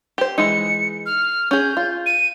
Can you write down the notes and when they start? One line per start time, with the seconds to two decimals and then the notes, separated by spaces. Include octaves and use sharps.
0.18 G4 C5
0.38 E3 G#3 D#4 C#7
1.06 F6
1.51 C#4 G#4 G6
1.77 F4
2.06 D#7